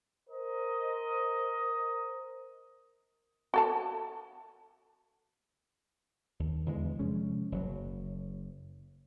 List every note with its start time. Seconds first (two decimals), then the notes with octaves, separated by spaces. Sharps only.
0.30 A#4 C5 D#5
3.54 F#4 A4 A5
6.40 D#2
6.66 E2 D3 E3 G#3
6.99 C3 F3 G#3 C#4
7.52 F#1 F#3